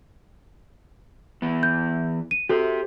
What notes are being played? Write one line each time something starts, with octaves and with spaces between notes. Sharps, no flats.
E3 B3
G6
D#7
F#4 G4 A4 C5